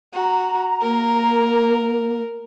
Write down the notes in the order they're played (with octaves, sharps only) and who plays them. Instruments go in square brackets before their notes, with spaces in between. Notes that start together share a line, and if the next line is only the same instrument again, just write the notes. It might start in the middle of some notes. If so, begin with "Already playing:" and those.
[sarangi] F#4 [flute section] A#5
[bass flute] A#3 [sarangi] A#4